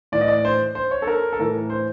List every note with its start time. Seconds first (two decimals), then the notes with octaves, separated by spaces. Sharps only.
0.12 A2 E3 D5
0.21 D#5
0.28 D5
0.45 C5
0.75 C5
0.91 C#5
1.02 A4
1.07 A#4
1.33 A4
1.39 A2 E3 A#4
1.70 C5